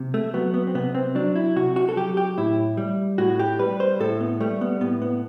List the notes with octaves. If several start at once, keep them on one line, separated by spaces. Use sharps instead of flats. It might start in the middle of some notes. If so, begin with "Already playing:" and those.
Already playing: C3
A3
F#3 B3
B3
C4
C3 B3
C4
F#3 D4
E4
C3 F#4
F#4
A4
F#3 G4
G4
A2 E4
G3
A2 F#4
G4
G3 B4
C5
A2 A4
B3
G3 A3
B3
A2 B3
B3